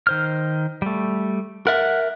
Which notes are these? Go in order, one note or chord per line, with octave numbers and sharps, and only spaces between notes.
D#3 C5 F6
G3 A3
A#4 E5 F#5